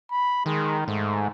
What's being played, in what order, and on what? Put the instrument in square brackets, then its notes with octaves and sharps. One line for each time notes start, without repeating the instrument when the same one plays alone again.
[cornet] B5
[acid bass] D#3 [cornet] G#3
[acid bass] G#2 [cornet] A3